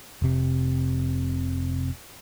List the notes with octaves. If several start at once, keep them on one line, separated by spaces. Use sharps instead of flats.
F1 C3